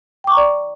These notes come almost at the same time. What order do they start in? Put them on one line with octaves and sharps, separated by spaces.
G5 D6 C#6 A#5 D5